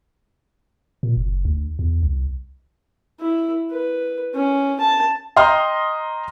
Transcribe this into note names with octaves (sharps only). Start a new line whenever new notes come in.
A#2
F#1
D2
E2
C2
E4
B4
C#4
A5
D#5 G5 A#5 C6 D#6 F6